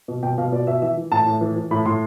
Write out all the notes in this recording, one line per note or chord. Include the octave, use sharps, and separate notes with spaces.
B2
B2 G5
B2 F5
B2 D5
B2 E5
E3 E5
E3
A2 A5
A2
E3
E3
A2 B5
A2 C6